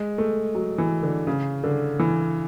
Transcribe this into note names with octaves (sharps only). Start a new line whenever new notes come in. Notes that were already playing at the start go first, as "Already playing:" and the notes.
Already playing: G#3
A3
F#3
E3
D3
C#3
D3
E3